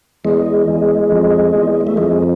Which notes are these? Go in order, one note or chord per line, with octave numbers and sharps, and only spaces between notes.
E2 G#3
E2
F2
E2
A3
F2 G#3